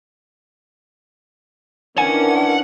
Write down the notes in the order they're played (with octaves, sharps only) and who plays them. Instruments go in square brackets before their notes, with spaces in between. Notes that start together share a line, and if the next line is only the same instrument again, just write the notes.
[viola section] D#3 C#4 [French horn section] E3 D4 [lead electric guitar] F#5 [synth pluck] G#5